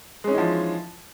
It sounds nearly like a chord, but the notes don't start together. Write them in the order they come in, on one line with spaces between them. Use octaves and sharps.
G#3 C#4 D#4 E3 F3